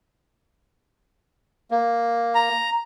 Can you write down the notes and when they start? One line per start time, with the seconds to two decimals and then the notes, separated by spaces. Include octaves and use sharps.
1.71 A#3
2.35 A#5